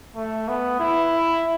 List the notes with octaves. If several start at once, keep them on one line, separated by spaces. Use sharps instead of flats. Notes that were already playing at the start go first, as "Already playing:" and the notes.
A3
B3
E4